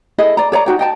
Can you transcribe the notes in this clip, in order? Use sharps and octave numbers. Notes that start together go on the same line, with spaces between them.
E4 G#4 A4 D#5
D5 A#5
A4 C#5 D5 A#5
D#4 F#4 G5
D#5 G5 A5